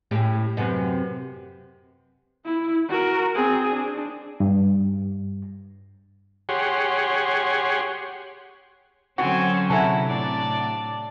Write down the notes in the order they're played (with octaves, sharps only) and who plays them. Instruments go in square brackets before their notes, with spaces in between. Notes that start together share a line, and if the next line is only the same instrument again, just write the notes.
[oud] A2 C#4 G4
F#2 C3 B3
[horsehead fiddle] E4
F#4 A#4
C4 G#4
D4
[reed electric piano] G2
[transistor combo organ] G4 G#4 C#5 F#5 C6
[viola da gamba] D3 F#3 C#4 [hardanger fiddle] C4 G#5 [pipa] F#4
[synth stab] C3 F#5 A#5 [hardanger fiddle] E4 [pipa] G#4 A4
[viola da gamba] A2 D5 [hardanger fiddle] D4